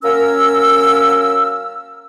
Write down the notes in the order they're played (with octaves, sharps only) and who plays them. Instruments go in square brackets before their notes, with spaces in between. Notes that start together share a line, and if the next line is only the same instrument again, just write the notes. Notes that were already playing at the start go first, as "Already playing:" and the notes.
[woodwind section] F#3 A#3 C#4 A#4 E6